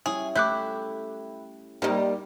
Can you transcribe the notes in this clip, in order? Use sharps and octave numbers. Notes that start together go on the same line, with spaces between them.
G3 C#4 E4 G#4
A3 E4 G4 D6 F#6 G6
C3 D#3 G3 A#3 D#4